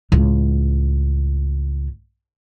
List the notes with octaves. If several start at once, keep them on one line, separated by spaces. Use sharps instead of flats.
C#2 A2